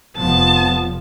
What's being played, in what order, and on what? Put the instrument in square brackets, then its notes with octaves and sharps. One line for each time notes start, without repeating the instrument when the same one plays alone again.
[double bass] F1 F3 [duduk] B3 [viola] A5